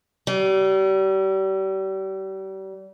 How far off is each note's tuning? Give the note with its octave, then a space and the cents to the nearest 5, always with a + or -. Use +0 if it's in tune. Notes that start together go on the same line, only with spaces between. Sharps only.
G3 -35